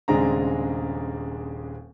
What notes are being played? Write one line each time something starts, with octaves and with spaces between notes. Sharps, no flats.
D#1 C#3 G#3 C4 D4 A#5